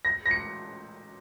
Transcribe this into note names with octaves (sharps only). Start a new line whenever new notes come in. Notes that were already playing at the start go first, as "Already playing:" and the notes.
A#6
A#6
C#7